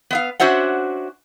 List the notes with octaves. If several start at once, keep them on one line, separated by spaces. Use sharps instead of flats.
B3 E5 F5
C#4 D4 F#4 C5 E5 F#5